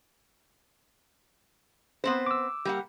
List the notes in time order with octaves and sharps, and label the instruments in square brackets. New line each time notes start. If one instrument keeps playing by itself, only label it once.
[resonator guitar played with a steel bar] B3 C4 C5
[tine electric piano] D6 E6
[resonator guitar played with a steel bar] G3 A#3 F#5